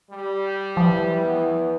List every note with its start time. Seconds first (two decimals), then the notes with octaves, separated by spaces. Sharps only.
0.11 G3
0.77 E3 F3
1.22 E2 B3